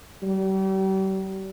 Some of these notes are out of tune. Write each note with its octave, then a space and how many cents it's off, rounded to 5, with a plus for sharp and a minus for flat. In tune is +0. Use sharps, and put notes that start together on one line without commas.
G3 -40